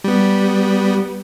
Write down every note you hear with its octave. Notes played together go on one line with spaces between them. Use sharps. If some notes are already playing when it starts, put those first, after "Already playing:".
G3 B3